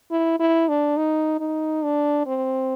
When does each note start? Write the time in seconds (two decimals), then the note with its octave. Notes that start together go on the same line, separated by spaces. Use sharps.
0.11 E4
0.40 E4
0.69 D4
0.97 D#4
1.40 D#4
1.83 D4
2.27 C4